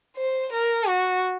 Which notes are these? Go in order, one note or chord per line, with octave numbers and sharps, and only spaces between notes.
C5
A#4
F#4